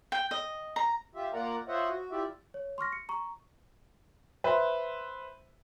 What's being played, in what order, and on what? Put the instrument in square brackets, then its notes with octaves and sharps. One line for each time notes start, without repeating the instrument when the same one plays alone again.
[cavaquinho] G5
D#5
A#5
[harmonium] F4 G4 E5
A#3 F4 A#4 D5 F#5 A#5
F4 C5 C#5 D#5 E5 F#5
F#4
E4 F4 G4 D5 E5
[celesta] C#5
C6 C#6 F6 A#6
C#7
A#5 C#6
[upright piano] B4 C5 E5